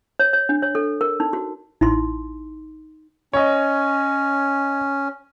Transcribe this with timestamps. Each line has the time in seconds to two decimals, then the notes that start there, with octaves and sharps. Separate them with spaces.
0.19 C#5
0.33 C#5
0.49 D4
0.62 C#5
0.75 A4
1.01 A#4
1.20 D#4
1.33 F#4
1.81 A1 D#4 E4 A#5 C6
3.33 C#4 C#5 D#5